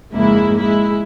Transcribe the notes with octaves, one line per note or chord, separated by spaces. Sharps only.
F2 G#2 C#3 G#3 A#3 E4
G#3 E4